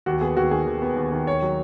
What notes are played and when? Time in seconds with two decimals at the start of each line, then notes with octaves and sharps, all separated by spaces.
0.06 D#2 F#4
0.21 B3 G#4
0.36 D#2 F#4
0.51 D#3 G#4
0.66 D#2
0.82 B3
0.96 D#2
1.12 D#3
1.27 D#2 C#5
1.42 F#3